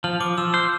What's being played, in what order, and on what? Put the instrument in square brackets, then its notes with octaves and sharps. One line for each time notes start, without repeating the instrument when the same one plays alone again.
[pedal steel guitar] F3 [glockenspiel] F6
[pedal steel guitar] F3 [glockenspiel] D6
[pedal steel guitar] F3 [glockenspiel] E6
[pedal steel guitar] C5 [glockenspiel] F6